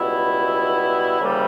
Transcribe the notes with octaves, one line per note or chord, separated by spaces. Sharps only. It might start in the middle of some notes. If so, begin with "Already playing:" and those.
Already playing: C#2 B2 G3 B3 E4
D2 C#3 E3 G3 A#3